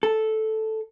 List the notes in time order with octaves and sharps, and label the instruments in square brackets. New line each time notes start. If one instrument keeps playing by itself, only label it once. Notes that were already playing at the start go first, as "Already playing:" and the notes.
[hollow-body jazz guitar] A4